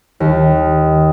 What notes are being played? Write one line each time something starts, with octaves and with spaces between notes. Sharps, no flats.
D#2